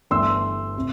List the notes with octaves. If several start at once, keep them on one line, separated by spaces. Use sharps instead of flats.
G1 G2 E3 A3 D4 C6 E6
C3